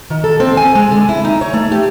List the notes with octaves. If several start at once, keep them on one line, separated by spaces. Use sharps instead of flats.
D#3
A4
C4
G#5
G#3
D3
E4
D#4
C#5
A3
G4